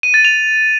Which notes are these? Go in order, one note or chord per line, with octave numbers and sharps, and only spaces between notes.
D#7
A6
F7